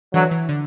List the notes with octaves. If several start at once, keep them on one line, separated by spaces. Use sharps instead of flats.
D3 E3 F#3
E3
D3